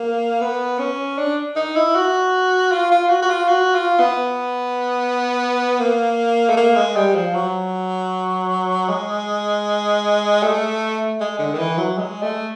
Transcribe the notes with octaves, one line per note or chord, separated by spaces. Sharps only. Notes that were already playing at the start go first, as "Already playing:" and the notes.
Already playing: A#3
B3
C#4
D4
D#4
E4
F#4
F4
F4
F#4
F#4
F4
F#4
F4
B3
A#3
A3
A#3
G#3
G3
F3
F#3
G#3
A3
G#3
D3
D#3
E3
F#3
G#3
A3